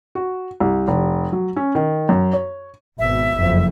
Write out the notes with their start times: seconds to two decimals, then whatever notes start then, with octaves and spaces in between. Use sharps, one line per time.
0.15 F#4
0.60 C2
0.88 F1
1.32 F#3
1.56 C#4
1.75 D#3
2.09 F#2
2.33 C#5
2.98 G#1 B2 E5
3.37 F#1 F2